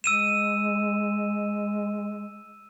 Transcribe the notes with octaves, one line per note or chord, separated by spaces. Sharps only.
G#3 E6 D#7 E7